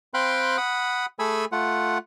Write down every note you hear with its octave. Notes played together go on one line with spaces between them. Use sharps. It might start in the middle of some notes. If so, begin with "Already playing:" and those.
C4 F5 G5 B5 C6 F#6
F#5 B5 D#6
A3 G#4 A4 G#5 B5 E6
A3 F4 F#5